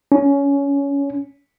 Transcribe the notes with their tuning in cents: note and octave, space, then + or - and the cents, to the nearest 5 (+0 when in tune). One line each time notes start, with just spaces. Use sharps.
C#4 +20